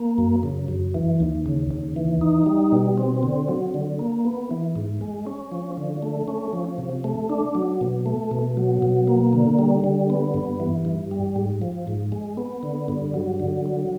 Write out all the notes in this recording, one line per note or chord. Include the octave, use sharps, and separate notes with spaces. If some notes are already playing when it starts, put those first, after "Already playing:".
Already playing: A#3
F#2
C#3
F#2
E3
D#2
C#3
D#2
E3
D#4
G3
B2
C4
D3
F#3
D3
A#3
B3
E3
G#2
G#3
C#4
F3
D3
A3
C#4
F3
C3
A3
D4
F#3
B2
A3
B2
F#3
B2
A#3
D3
G3
D3
B3
G2
E3
G2
G3
G#2
F3
G#2
G#3
B3
D3
G2
F#3
D3
F#3